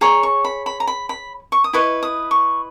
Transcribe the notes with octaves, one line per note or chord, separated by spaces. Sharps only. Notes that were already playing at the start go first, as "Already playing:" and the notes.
G#4 C#5 A#5
C#6
B5
B5
A#5
B5
B5
C#6
D#6
E4 B4 D#5 C#6
D#6
C#6